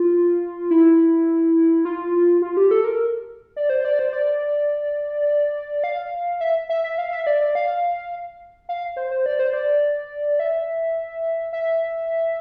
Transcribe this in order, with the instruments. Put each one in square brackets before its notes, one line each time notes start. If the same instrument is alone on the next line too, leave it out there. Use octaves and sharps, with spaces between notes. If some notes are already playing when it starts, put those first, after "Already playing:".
Already playing: [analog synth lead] F4
E4
F4
F4
G4
A4
A#4
D5
C5
D5
C5
D5
F5
E5
E5
E5
F5
E5
D5
D5
F5
F5
C5
C5
D5
C5
D5
E5
E5